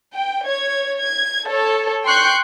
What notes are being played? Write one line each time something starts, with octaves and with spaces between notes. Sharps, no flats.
G5
C#5 G#6
G#6
A4 C#5
G5 C6 C#6 F#6 G6